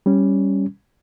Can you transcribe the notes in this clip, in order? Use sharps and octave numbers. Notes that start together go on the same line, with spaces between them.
G3 C#4